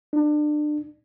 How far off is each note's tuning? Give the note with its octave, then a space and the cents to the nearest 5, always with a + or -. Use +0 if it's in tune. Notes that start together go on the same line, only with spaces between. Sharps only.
D4 +30